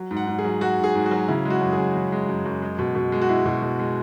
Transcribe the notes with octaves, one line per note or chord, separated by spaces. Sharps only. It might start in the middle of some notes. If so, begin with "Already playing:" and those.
Already playing: F#3
G#2
F#5
G#2
G#4
F#3
F#3 F#4
G#2
G#4
G#2
F#4
F#3
C#3 E4
G#3
F#4
F#2
G#4
F#2
C#3
G#3
F#2
F#2
G#3
B2
B2
G#3
F#4
G#3 E4
B2
B2
G#3